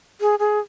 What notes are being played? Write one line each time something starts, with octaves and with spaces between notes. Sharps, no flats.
G#4
G#4